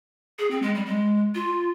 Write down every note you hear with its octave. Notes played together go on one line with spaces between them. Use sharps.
G#4
C4
G#3
G3
G#3
F4